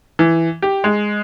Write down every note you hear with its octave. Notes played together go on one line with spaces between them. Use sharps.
E3
G4
G#3